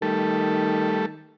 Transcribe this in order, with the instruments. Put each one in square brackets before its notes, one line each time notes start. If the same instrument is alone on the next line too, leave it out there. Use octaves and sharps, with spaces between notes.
[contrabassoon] D#3 [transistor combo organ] G3 A3 A4